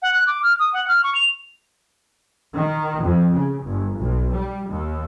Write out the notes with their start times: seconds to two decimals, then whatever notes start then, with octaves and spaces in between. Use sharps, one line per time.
0.02 F#5
0.14 F#6
0.27 D6
0.43 F6
0.59 D#6
0.74 F#5
0.88 F6
1.04 C#6
1.15 F7
2.56 D#3
3.05 F2
3.35 C#3
3.65 G1
4.00 B1
4.34 G3
4.72 D#2